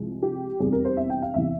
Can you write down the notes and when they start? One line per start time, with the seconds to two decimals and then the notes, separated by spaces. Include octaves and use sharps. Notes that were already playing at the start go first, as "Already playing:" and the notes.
Already playing: C2 C3 F3 G#3
0.23 G4
0.59 F1 E2 C3 G3 G#4
0.72 A#4
0.85 C5
0.97 E5
1.10 G5
1.22 F5
1.34 E2 C3 E3 E5